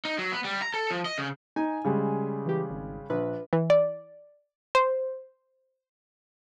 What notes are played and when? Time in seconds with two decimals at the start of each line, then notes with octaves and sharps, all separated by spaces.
0.05 D#4
0.19 F#3
0.32 B3
0.44 G3
0.62 A#5
0.74 A4
0.91 F3
1.05 D#5
1.18 C#3
1.56 D#4 G#5
1.85 C#3 G3 G#3
2.46 E3 G4
2.70 G#1
3.10 A#1 B4
3.53 E3
3.70 D5
4.75 C5